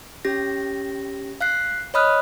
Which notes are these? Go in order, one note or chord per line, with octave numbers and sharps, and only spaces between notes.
C#4 G4 A#6
F5 F#6 C7
C#5 D#5 B5 D#6 F6 F#6